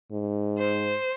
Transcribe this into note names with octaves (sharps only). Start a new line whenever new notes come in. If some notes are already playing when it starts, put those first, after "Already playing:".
G#2
C5